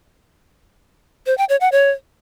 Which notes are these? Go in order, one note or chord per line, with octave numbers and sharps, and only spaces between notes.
C5
G5
C#5
F#5
C#5